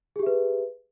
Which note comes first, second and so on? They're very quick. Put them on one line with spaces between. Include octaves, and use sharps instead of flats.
G#4 G4 E5 B4